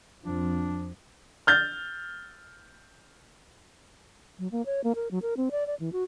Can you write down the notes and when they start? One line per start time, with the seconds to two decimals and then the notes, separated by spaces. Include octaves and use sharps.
0.24 F2 F3 D4
1.47 F6 G6 A6
4.39 F#3
4.52 A#3
4.66 C#5
4.84 A#3
4.95 A#4
5.11 F#3
5.22 A#4
5.37 C4
5.51 D5
5.67 D5
5.80 E3
5.93 F#4